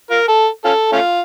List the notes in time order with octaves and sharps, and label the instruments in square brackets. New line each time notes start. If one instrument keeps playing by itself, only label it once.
[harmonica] F4 A#4
A4
C#4 F4 A4
A3 C#4 F4